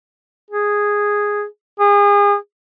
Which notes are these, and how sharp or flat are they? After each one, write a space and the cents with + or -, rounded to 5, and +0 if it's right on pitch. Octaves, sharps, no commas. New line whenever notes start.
G#4 -5
G#4 -35